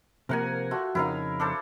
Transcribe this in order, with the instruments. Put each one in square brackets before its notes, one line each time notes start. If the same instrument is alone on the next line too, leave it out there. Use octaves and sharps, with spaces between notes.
[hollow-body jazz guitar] C3 F3 A#3 [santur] A#4 F#5 G#5
[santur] A3 F4 F#4
[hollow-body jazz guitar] F2 C#3 D#4 [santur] E4 A#4 F5
[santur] D4 A4 C5